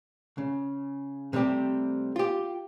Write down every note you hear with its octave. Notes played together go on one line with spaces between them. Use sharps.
C#3
C3 G3 A3 C4 G4
F4 G4